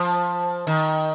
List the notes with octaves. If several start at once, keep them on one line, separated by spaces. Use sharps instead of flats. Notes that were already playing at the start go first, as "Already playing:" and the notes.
Already playing: F3
D#3